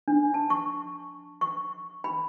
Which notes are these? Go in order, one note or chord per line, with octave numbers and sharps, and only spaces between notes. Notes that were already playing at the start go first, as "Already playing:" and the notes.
D4
A5
C#6
C#6
B5